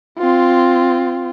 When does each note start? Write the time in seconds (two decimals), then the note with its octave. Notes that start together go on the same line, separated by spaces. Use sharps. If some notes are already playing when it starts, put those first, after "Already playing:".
0.19 C4 F4